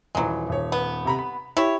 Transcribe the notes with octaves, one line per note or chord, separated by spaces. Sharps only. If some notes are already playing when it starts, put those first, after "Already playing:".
D#1 E3 F#3 G#3
D#1 C#5
B3
C3 A#5 B5
B5
E4 G4 C#5